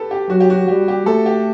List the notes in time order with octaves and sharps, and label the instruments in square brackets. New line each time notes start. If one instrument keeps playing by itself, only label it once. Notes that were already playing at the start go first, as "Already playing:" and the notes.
Already playing: [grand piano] G4 A4 B4
G4
[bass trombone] F#3 [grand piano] F#4
[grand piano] G4
F#4
[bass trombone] G3 [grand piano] G4
[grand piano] G4
[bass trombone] A3 [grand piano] A4
[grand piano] G4